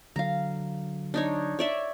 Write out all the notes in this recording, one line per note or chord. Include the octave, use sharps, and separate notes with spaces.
D3 F#3 F5 A#5
D4 D#4 C#5
C#5 D5 E5